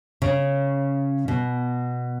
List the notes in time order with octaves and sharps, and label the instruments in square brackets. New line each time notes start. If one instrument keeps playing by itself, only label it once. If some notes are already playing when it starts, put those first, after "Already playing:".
[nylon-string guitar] C#3
B2